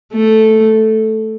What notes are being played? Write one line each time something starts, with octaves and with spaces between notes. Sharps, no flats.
A3